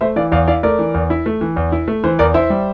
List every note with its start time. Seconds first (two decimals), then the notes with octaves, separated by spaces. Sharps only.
0.01 A3 C5 E5
0.16 E3 D5 F5
0.32 E2 D5 F5
0.47 E4 D5 F5
0.63 A3 A#4 D5
0.79 E3
0.94 E2
1.10 E4
1.26 A3
1.41 E3
1.56 E2
1.72 E4
1.88 A3
2.04 E3 C5
2.19 E2 A#4 D5
2.34 E4 C5 E5
2.50 G3